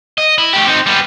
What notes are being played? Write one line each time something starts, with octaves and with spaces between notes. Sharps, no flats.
D#5
E4
A3 G4
C4 D#4
G3 B3